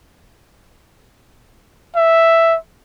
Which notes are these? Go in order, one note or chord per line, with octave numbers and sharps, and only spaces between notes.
E5